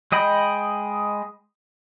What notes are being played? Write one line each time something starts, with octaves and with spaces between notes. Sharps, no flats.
G#3 D#5 G5 B5